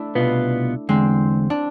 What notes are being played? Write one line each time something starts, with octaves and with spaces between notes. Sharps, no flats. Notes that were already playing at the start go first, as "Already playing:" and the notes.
Already playing: A3 D4 E4
C2 B2 B3 F4 B4
E2 D3 G#3 C4
D4